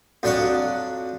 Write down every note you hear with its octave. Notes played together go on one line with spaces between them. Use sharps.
F2 F#3 D4 D5 C#6 D#6